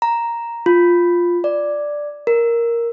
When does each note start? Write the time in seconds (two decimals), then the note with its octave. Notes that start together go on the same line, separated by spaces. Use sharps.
0.02 A#5
0.66 F4
1.44 D5
2.27 A#4